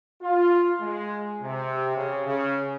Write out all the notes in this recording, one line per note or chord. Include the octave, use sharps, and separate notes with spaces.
F4
G#3
C3
C#3
C#3